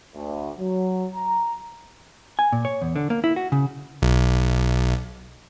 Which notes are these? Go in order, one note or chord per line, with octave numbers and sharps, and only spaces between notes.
D2
F#3
A#5
G#5
A#2
C#5
E2
D3
A#3
E4
F#4
C#3
B1